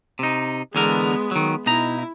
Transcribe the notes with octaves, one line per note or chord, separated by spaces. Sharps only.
C3 D#4
E2 D3 G#3 B3 A#4
D#3 F#3
B2 D#4 E4 A#5